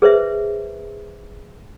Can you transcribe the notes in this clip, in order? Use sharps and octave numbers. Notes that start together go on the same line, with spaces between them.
G#4 B4 C5 E5